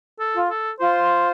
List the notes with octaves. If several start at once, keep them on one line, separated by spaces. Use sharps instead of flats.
A4
F4
A4
F4 C5